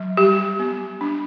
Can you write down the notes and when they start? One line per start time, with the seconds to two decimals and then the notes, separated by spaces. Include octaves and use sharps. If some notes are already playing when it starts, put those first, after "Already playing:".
Already playing: F#3
0.17 G3 G4
0.59 B3
1.01 D4